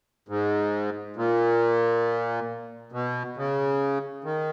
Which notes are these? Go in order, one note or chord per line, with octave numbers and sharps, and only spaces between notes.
G#2
A#2
B2
C#3
D#3